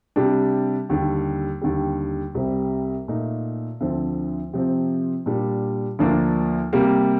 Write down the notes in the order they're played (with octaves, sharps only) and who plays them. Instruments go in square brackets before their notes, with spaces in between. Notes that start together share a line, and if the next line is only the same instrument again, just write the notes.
[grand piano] C3 G3 D4
D#2 D3 G3
D#2 D3 G3
C2 C3 G3 C4
A#2 A3 D#4
D2 D3 F3 C4
C3 F3 C4
A#2 G3 D4
D2 D3 F3 A#3 D4
C3 G3 A#3